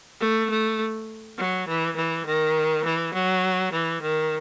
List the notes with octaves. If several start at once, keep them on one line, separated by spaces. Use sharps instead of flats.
A3
A3
F#3
E3
E3
D#3
E3
F#3
E3
D#3